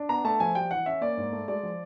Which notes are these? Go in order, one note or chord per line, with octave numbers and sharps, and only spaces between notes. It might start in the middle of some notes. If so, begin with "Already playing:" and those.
Already playing: D4
B3 A#5
A3 A5
F3 G#5
G3 G5
E3 F#5
C#4 E5
A#3 D5
G#2
A3
G#3 D5
F3